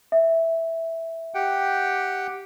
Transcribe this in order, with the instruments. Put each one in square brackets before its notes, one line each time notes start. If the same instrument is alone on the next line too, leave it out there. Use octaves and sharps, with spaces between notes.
[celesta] E5
[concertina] G4 F#5 G5